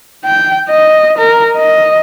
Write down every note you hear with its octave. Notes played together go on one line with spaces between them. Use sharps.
G5
D#5
A#4
D#5